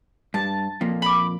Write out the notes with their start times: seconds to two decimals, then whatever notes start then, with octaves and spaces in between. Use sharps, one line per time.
0.34 G2 A5
0.81 F2 A#2 A#3
1.02 B5 D6